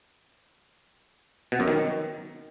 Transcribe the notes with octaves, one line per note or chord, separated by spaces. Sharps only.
B2
F#2
D#3